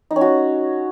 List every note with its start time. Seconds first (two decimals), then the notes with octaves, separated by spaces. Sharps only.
0.11 D#4
0.16 C#4
0.21 F#4